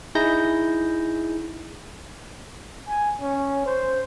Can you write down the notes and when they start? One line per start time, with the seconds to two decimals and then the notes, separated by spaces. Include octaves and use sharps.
0.15 D#4 E4 G#4 G6 A#6
2.88 G#5
3.21 C#4
3.66 C5